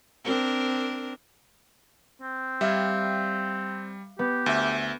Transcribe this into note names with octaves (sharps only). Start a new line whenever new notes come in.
C4 D4 A#4
C4
G3 E5 F5 G#6
B3 G4
D2 E5